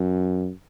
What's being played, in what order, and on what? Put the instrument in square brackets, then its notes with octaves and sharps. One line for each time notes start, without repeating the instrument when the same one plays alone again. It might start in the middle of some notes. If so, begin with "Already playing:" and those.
Already playing: [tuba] F#2